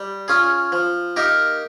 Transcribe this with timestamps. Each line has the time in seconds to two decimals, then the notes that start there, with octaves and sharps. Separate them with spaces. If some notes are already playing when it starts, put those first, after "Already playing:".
Already playing: G3
0.28 C#4 F4 G#4
0.72 F3
1.16 A#3 D#4 G4 A#4